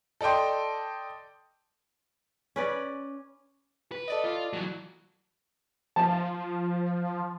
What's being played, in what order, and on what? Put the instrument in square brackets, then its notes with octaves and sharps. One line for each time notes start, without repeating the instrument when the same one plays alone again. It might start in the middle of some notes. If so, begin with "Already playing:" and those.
[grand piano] A4 D5 D#5 G5 C6
[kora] C#4 B4 D5
[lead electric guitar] B4
[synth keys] A4 D5 D#5
[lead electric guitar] F4
E3 F#3
[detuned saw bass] F3 [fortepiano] A5